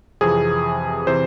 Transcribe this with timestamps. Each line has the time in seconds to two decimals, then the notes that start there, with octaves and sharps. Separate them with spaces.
0.21 F2 C3 E3 G#4
1.07 C3 E3 C5